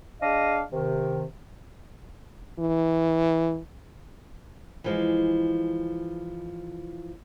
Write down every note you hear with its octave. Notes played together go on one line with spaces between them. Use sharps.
D4 G#4 D#5 F5
C3 D#3
E3
E3 F3 G#3